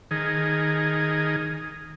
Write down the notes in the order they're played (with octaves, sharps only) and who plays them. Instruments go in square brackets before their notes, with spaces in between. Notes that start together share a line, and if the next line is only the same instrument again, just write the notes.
[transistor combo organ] D#3 G#4